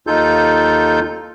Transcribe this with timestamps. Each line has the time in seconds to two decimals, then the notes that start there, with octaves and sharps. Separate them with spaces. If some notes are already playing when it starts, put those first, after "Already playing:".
0.07 D#2 D#4 F4 A4 G6